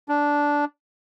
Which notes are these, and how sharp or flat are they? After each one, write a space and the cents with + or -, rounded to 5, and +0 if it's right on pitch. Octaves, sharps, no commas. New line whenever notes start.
D4 -10